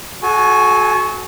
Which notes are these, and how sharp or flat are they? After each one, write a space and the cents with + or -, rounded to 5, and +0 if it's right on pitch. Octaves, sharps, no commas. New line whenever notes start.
F#4 +0 A4 -40 G#5 +0